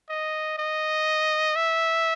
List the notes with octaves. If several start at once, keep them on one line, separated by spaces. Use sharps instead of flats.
D#5
D#5
E5